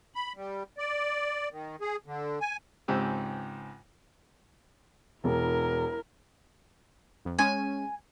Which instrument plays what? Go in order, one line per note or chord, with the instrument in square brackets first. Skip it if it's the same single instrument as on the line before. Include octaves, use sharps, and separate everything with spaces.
[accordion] B5
G3
D5
D#3
G#4
D3
G#5
[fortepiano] C#2 G#2 C4 G4 E6
[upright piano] E1 [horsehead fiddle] E4 A#4
[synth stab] F2
[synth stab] G#3 C#4 [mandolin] G#5